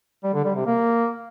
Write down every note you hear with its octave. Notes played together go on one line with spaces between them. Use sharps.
G3
D3
G3
C3
A#3